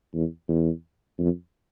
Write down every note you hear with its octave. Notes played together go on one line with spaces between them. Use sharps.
E2
E2
F2